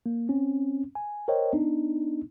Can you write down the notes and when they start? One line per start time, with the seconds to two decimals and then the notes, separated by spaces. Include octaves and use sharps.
0.06 A#3
0.29 C4 C#4
0.95 G#5
1.28 A#4 C5 C#5 D#5 G5
1.53 B3 D4 D#4